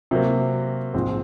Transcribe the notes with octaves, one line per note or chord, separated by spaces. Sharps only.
C3 F#3 A#3
A#1 G#2 F3 C4